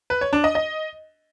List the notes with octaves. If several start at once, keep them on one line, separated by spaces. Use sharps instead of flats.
B4
C#5
D4
D#5
D#5